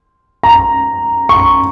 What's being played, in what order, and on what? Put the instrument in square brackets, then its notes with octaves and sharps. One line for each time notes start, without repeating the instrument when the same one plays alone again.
[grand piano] A#5
C#6